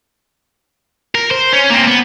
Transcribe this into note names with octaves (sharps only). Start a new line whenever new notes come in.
A#4
C5
C#4
A#3 C4
B3